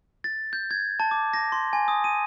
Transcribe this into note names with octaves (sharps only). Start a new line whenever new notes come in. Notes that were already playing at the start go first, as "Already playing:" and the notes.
A6
G6
G#6
A5
D6
A#6
C6
G#5
D#6
D#7